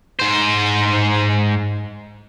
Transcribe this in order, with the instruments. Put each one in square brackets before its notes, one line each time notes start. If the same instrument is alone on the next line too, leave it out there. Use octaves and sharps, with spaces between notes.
[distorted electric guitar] G#2 C5